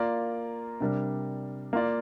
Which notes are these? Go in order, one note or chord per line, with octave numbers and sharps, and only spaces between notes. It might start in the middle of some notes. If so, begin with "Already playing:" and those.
Already playing: A#3 F4 A#4 D5
C3 G3 D4 A#4
A#3 F4 D5